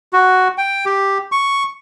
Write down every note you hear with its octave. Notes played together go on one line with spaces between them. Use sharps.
F#4
G5
G4
C#6